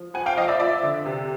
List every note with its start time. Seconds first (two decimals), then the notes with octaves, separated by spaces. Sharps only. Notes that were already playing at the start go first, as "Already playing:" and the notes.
Already playing: F3
0.14 F2 F#5 G#5
0.26 F5 G5
0.37 F3 D#5 F5
0.48 D5 E5
0.60 F3 D5 E5
0.83 D3
1.06 C3